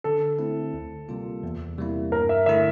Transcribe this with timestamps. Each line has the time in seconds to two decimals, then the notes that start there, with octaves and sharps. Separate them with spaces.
0.04 D3 A4
0.39 A3 C4 E4
0.74 D2
1.09 C3 G3 A#3 F4
1.43 E2
1.78 C3 G3 A#3 E4
2.12 G2 A#4
2.29 E5
2.46 D3 A3 E4 E5